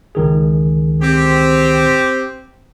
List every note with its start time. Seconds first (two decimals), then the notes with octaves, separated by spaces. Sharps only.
0.15 C#2 D#3 G#4
1.01 C4 G4